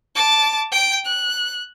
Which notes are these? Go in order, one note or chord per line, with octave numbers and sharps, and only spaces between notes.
A5 D6
G5 D7
F#6